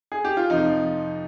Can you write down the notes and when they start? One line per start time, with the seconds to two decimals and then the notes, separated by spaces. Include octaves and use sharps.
0.12 G#4
0.25 G4
0.37 F4
0.50 F2 C3 F3 D#4